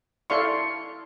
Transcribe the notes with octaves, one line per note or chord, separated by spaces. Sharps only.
E4 A4 D5 F5 C6 C#6